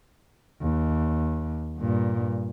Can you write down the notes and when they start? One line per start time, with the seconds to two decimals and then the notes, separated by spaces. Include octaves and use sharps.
0.62 D#2
1.78 G2 A#2